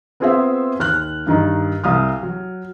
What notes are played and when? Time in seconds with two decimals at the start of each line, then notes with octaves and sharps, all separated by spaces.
0.20 B3 C4 F4 G#4 C5 E5
0.79 D#2 F6 F#6
1.27 G2 D#3 D#4
1.84 C2 F5 D#6 F6
2.23 F#3